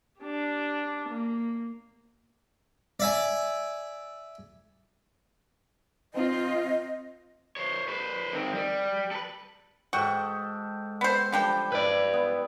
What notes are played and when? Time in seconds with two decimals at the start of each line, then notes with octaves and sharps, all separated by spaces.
0.20 D4 G4
1.09 A#3
3.00 D5 E5 G#5
6.14 C4 F4 D#5
7.57 C5 C#5
7.88 B4 C5
8.33 D#3 C4
8.55 G3
9.11 A4 B4
9.93 G#2 F#4 A4 G5
11.01 B3 C5
11.32 D3 F3 G3 G5
11.72 E4 B4 D5
12.14 B3